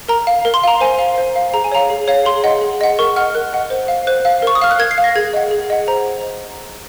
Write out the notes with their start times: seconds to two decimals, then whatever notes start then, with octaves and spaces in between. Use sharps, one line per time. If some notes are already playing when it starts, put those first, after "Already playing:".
0.08 A#4 A#5
0.27 F5
0.45 A#4
0.54 C6
0.64 F5 A#5
0.81 C5 G#5
0.99 F5
1.18 C5
1.36 F5
1.53 G#4 A#5
1.64 G#5
1.72 C#5 F5 A#5
1.90 G#4
2.08 C#5 F5
2.26 G#4 C6
2.44 D#5 F#5
2.61 G#4
2.81 D#5 F#5
2.99 A#4 C#6
3.16 D#5 F#5 F6
3.35 A#4 F#6
3.53 D#5 F#5
3.70 C5
3.88 F5
4.07 C5 F#6
4.25 F5
4.42 A#4 C#6
4.55 D#6
4.62 F5 F6
4.71 F#6
4.79 A#4 G#6
4.91 C7
4.98 F5
5.04 A#6
5.16 G#4 G#6
5.33 D#5 F#5
5.51 G#4
5.70 D#5 F#5
5.88 C5 A#5